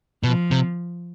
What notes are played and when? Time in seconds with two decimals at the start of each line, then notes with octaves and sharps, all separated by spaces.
0.23 B2 F3
0.51 C3